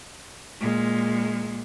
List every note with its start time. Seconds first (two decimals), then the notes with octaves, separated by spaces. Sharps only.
0.60 A#2 G#3